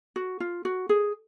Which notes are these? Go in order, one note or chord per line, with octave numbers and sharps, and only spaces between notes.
F#4
F4
F#4
G#4